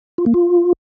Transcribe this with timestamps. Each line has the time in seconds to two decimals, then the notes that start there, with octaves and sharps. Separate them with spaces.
0.18 F4
0.26 A#3
0.34 F4